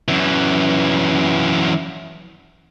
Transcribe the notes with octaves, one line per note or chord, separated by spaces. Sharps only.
F#2 E3